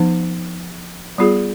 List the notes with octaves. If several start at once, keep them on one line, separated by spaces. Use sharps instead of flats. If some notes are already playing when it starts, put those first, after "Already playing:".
Already playing: F3 B3 D#4
G3 B3 F4 G#4